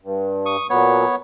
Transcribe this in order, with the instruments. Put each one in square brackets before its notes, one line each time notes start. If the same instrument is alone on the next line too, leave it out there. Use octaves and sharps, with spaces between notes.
[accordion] G2
[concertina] C#6 D#6
[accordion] A#2 F#3 [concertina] B3 C#5